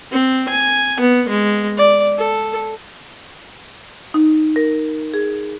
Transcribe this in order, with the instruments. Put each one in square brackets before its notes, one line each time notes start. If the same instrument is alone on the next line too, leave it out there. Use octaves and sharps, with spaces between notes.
[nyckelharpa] C4
G#5
B3
G#3
D5
A4
[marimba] D#4
A#4
G#4